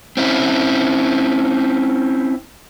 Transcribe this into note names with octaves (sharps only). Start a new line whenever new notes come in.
C4 C#4 E4